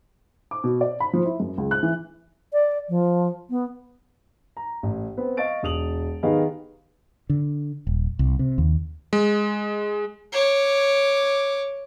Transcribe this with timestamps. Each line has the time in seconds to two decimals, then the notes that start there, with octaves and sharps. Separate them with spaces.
0.51 D6
0.64 B2
0.81 D5
1.00 B5
1.13 F3
1.25 E4
1.40 F#2
1.58 C#2
1.71 F#6
1.83 E3
2.53 D5
2.89 F3
3.50 B3
4.57 A#5
4.83 A1
5.17 B3 C4
5.37 D#5 F5 C#6 A6 D7
5.63 E1 D#6 F7 F#7
6.23 D#3 B3 G4 G#4 D#5 F5
7.30 D3
7.87 D#1
8.19 C2
8.39 C3
8.58 D#2
9.13 G#3
10.32 C#5 D6